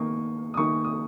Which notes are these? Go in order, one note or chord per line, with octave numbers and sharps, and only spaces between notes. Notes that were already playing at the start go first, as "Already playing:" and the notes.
Already playing: D#3 A#3 D#4 C#6 D#6
D#6
D#3 A#3 D#4 C#6
D#6